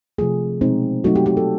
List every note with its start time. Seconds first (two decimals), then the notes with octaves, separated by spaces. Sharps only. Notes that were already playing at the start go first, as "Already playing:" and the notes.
0.18 C3 F3 A3 G#4
0.61 B2 G#3 C4 D#4
1.04 F#3 A3 C4 D#4 F#4
1.16 G4
1.26 G4
1.37 A4